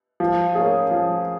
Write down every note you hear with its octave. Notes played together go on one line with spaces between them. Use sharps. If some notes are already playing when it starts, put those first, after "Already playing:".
F3
A#3 C#4 G#4
F3